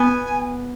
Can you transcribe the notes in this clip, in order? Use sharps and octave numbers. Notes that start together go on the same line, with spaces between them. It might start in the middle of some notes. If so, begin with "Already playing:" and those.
Already playing: B3 G#5